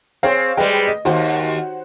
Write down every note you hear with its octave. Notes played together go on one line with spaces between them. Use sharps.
C4 G#4 C#5 F5
G3 G#3 B4 G5
D#5
D#2 F#4 C5 F#5